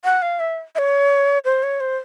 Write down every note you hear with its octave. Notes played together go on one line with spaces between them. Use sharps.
F#5
F5
E5
E5
C#5
C5
C#5
C5